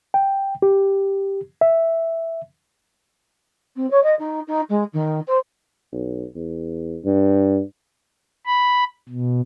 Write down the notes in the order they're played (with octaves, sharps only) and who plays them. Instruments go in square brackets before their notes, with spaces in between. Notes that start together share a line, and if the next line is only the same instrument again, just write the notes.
[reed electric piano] G5
G4
E5
[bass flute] C4
C#5
D#5
D#4
D#4
G#3
D#3
C5
[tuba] B1
E2
G2
[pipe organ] B5
B2